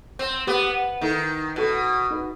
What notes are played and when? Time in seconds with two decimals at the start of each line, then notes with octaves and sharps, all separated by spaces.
0.19 C4
0.47 B3 G4 C5 D#5
1.01 D#3 E4 A4 D#5
1.56 B2 E4 A4 D#5
2.10 D#4 F#4 B4 D#5